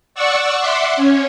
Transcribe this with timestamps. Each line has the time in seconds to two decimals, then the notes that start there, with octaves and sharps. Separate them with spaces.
0.15 D5 F#5 C#6 E6
0.59 E5 F#5 C6 D6
0.96 C#4 C#5